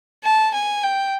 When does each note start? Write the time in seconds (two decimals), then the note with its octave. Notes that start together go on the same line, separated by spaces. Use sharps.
0.24 A5
0.54 G#5
0.84 G5